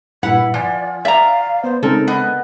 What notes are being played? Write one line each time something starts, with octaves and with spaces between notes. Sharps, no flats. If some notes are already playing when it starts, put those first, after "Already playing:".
G2 A#2 E4 B4 F#5
F3 D5 F#5 G#5
D5 E5 F5 A#5
B3 C5
C#3 G#3 C4 D#4 A4 A#4
B3 D#5